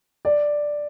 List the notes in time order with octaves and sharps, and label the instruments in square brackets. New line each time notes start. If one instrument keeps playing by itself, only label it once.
[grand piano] D5